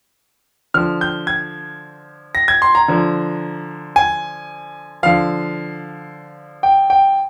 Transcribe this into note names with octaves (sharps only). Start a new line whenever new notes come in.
D3 F3 F6
G6
G#6
A#6
G#6
C6
A#5
D3 F3
G#5
D3 F3 F5
G5
G5